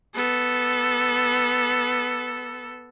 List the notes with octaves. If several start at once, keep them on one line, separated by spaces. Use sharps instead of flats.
B3 A4